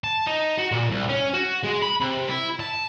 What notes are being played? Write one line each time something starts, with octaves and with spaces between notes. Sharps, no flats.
A5
D#4
F#4
A#2
C2
C#4
F#4
G#3
B5
C3
E4
A5